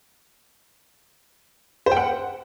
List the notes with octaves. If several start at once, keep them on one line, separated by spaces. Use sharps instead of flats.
C5
G5
F#5